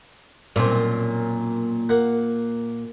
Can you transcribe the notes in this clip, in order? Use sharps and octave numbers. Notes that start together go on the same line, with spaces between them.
B1 F#2 A#2 C4
A#3 F#5